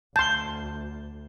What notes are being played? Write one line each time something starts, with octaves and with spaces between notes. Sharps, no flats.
D2 A5 C6 G6